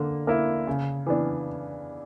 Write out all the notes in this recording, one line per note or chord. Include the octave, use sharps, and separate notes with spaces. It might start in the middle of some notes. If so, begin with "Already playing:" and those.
Already playing: D3 A#3
A#3 E4
C#3
E3 B3 D4